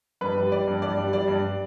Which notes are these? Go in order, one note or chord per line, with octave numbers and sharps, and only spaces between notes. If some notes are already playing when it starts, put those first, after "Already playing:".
G2 B4
G3
G3 D5
G2
G2 D5
G3
G3 D5
G2